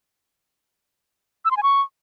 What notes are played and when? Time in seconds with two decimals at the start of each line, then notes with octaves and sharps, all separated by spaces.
1.45 E6
1.51 C6
1.57 G#5
1.63 C#6